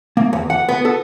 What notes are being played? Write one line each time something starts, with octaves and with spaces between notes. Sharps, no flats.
A#3
E2
F#5
B3
A4